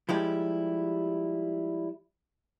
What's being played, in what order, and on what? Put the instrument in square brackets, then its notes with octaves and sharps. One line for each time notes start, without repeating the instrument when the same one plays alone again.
[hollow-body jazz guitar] F3 G3 G#3 E4 G4